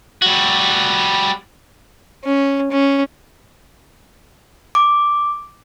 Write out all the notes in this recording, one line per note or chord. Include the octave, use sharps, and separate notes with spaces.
G3 F#4
C#4
C#4
D6